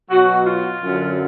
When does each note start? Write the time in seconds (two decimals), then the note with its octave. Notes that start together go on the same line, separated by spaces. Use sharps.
0.10 B2 F#3 F#4
0.46 F4
0.81 F#2 D3 F#3